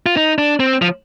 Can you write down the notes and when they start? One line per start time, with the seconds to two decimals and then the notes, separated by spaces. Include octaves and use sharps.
0.06 F4
0.17 D#4
0.38 D4
0.60 C4
0.82 F3